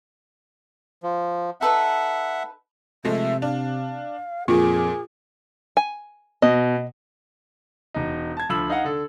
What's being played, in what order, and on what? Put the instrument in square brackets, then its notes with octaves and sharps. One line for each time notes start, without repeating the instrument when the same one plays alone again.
[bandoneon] F3
[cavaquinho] D#4 A4 B4 [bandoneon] E5 F#5
[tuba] C3 [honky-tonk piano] F3 G#3 A3 [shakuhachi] E5
[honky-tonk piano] D4 [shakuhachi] F5
[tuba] F2 [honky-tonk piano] A#2 A#3 [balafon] F4 [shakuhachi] G#4
[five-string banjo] G#5
[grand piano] B2 [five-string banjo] D#5
[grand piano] E1 D#4
A5 G#6
D2 F3 B5 E6 F#7
D#4 F5 F#5
D3 A4